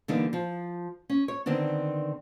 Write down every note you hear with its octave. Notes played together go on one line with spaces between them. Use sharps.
D3 E3 G3 A#3 B3 D#4
F3
C#4
C#5
D3 D#3 B3 C4 D4